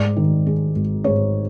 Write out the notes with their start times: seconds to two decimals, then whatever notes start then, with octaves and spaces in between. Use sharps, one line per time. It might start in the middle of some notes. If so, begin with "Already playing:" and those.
Already playing: G#2 D5
0.16 D#3
0.46 G#3
0.76 G#1
1.04 G#2 C#5